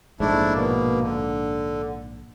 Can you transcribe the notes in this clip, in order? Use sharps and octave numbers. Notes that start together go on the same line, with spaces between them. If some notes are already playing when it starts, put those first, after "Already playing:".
A#1 G#2 A3 D4 E4
B2 A#3
D3